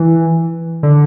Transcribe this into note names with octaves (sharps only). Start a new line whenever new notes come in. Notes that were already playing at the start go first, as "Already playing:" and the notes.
Already playing: E3
D3